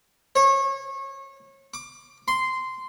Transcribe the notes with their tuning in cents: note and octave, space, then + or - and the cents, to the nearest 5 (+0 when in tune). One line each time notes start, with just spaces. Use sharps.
C#5 -30
D6 +20
C6 -10